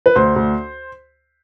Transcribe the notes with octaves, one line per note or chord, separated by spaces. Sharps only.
B4
D2 C5
D2